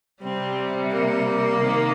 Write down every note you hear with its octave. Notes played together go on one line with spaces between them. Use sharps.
C3 G3 C4
A#3
C3 D#3